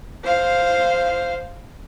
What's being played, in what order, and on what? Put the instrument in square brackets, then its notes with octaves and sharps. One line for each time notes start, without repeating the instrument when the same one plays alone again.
[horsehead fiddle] C5 F5